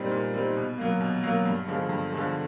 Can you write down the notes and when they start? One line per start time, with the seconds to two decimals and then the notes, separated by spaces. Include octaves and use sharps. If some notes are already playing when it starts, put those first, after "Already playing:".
Already playing: A#2 G3 C4 D#4
0.12 A#2
0.34 G3 C4 D#4
0.56 B2
0.78 F#3 A#3
1.01 B2
1.23 F#3 A#3
1.46 G2
1.68 D3 F3 G#3
1.89 G2
2.12 D3 F3 G#3